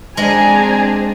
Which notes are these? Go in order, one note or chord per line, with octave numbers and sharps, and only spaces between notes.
G#3 C4 D4 G#4 G#5 A#5